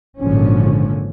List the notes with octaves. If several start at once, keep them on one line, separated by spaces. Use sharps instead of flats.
G#1 A#2 D3 F3 C#4